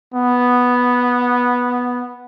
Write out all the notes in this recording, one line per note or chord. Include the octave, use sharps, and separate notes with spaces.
B3